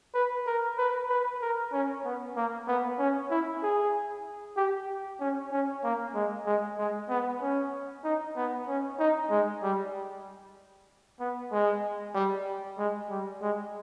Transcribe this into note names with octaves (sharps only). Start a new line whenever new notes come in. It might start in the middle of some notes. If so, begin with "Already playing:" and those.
B4
A#4
B4
B4
A#4
C#4
B3
A#3
B3
C#4
E4
G#4
G4
C#4
C#4
A#3
G#3
G#3
G#3
B3
C#4
D#4
B3
C#4
D#4
G#3
G3
B3
G#3
G3
G#3
G3
G#3